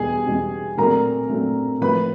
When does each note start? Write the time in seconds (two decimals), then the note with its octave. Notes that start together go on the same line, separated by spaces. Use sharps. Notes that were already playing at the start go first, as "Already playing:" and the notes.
Already playing: E2 B2 G3 G#4 G#5
0.26 E2 B2 G3
0.78 A#2 F#3 A3 C4 A#4 A#5
1.30 A#2 F#3 A3 C4
1.81 A2 F3 A#3 B4 B5